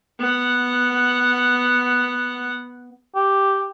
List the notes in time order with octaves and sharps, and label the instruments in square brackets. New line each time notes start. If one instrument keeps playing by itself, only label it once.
[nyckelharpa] B3 F#5
[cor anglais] G4